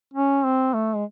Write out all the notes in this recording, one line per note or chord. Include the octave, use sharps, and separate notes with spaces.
C#4
C4
A3
G#3